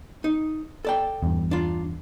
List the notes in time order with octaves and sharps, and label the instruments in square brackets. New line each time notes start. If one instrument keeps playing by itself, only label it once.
[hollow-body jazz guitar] D#4
A4 D5 G5
[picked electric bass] E2 G2
[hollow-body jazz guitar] D4 F4